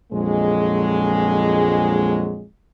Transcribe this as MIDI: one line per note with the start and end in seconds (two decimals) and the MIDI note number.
0.12 2.45 34
0.12 2.45 41
0.12 2.45 54
0.12 2.45 56